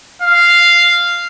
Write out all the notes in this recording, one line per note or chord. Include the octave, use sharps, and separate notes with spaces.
F5